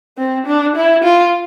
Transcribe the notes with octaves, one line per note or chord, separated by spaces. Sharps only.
C4
D4
E4
F4